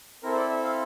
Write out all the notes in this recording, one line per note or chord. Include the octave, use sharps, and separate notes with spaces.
C4 E4 A4 A#4
C5
D5
E5
F5